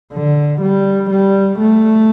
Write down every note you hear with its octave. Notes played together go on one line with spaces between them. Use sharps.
D3
G3
G3
A3